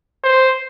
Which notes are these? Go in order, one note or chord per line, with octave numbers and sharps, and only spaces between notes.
C5